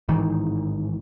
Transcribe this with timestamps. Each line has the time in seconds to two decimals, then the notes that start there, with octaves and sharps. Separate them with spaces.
0.08 A1 G#2 D#3 E3